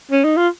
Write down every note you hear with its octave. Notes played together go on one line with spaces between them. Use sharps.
C#4
D#4
F4